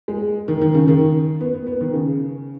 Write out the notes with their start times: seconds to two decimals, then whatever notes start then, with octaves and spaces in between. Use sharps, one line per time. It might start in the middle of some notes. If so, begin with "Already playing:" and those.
0.08 G#3
0.48 D#3
0.62 D#3
0.75 C#3
0.88 D#3
1.41 B3
1.54 B3
1.67 B3
1.81 D#3
1.93 C#3